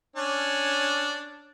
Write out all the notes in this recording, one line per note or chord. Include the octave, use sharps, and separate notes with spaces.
C#4 D4